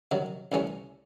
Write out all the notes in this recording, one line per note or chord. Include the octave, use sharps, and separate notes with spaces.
C3 D#3 F#3
C2 C3 E3 A3 C#4